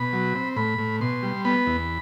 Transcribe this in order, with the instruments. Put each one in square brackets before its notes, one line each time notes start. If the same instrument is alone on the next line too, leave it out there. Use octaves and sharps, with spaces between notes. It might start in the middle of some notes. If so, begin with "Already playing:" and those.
Already playing: [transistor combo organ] B2 B5
F#3
C4
A2 B5
A2
B2 C6
G3
B3 B5
E2